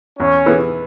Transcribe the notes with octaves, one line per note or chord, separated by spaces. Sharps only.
E2 C#4
E3 B3 G#4